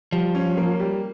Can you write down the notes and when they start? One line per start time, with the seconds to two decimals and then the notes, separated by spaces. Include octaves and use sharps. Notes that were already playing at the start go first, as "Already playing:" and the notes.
0.12 F3 G3
0.35 C#4
0.57 A#3
0.80 G3